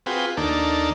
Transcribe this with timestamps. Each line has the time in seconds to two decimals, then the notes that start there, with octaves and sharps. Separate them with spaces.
0.06 C4 F4 F#4 G#4 B4 G5
0.37 D#2 A#3 D4 D#4 A4 D5